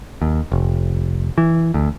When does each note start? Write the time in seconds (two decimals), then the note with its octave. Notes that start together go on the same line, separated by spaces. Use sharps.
0.22 D#2
0.52 F1
1.38 E3
1.74 D2